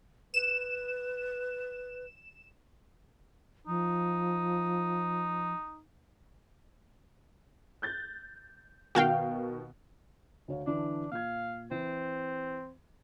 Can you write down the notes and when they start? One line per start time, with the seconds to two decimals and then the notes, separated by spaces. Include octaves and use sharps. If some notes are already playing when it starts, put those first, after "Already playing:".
0.34 B4 E7
3.67 F3 D#4
7.82 F#6 G6 A6
8.95 B2 D#3 F#4 F5 G5
10.48 D2 C#5 F5
10.67 D3 E3 D4
11.11 A#2 F4 F5 G#6
11.71 E3 C4